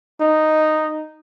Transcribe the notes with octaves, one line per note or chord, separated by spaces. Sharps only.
D#4